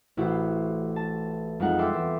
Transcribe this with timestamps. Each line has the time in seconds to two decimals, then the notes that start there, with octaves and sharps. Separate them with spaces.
0.17 A1 E4 F#4 G4 C5
0.96 A5
1.60 F2 G#3 D#4 F#5
1.79 A4 E5 G5 C6 D6 E6
1.92 E2 E5